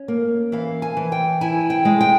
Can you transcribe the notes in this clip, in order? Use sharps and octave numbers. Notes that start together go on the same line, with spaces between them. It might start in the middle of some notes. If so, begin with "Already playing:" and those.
Already playing: C#4
A#3
E3 F5
G#5
E3
G5
E4 G#5
G5
G#3
G5